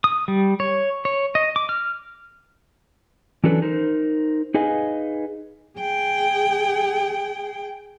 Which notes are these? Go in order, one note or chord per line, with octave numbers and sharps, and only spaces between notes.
D#6
G3
C#5
C#5
D#5
D6
F6
E3 F#3 C#4 D4 A4 B4
D#4 A#4 C5
D#4 G#4 B4 D#5 F5 G#5
G#4 G5